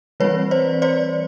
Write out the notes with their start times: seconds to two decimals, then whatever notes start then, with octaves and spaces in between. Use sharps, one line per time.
0.20 E3 G3 C4 B4 C#5
0.51 C5 D5
0.82 C5 D5